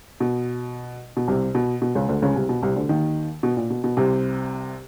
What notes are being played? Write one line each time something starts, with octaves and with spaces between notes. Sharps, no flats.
B2
B2
C2 C3
B2
B2
C#2 C#3
D2 D3
C#2 C#3
C2 C3
B2
C2 C3
D2 D3
D#2 D#3
B2
A#2
B2
B2
C2 C3